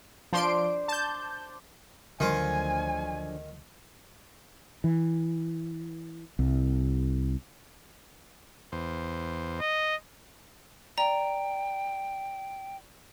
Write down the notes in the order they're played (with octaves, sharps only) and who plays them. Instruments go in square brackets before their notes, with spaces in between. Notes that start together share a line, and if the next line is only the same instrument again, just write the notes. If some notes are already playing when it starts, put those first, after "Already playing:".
[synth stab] F3 C6 D7 [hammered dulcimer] D4 C5
[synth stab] A5 G6
[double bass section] D2 F#3 [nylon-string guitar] D3 F3 C5 [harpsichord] D#3 F4 [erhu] G#5
[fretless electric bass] E3
C2
[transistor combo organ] E2 C5
[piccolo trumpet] D#5
[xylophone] D5 A#5 [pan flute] G5